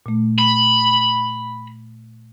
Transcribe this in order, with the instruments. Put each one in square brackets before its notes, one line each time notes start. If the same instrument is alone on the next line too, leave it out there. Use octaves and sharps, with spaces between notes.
[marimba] A#2 A3
[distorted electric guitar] B5